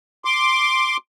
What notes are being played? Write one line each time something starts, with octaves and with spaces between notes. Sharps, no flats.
C6 D6